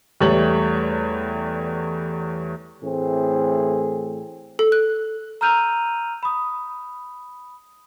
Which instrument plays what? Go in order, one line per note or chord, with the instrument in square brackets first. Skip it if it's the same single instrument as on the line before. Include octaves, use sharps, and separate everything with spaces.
[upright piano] E2 G3 A3 C#5 F#7
[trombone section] A2 E3 A3 C4 G#4
[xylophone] A4
F#6
[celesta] A#5 E6 F6 G6 D#7 F7
B5 D#6